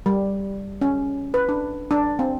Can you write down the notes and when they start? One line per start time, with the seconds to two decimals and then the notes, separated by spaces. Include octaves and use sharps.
0.06 G3
0.81 C#4
1.34 B4
1.49 D4
1.91 D4
2.19 C4